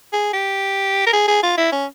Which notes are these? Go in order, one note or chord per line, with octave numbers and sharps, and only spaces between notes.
G#4
G4
A#4
G#4
G#4
F4
E4
C#4